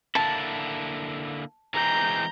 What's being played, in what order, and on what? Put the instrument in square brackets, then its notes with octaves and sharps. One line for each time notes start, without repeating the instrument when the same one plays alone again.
[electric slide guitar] D3 A#3 E4 [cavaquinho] A5
[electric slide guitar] E3 G#3 C4 [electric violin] A#5 G6